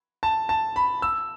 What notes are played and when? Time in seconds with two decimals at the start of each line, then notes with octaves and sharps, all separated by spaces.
0.23 A5
0.49 A5
0.76 B5
1.02 E6